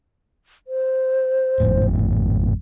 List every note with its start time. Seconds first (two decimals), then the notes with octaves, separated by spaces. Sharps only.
0.68 C5
1.60 G#1 F2 A2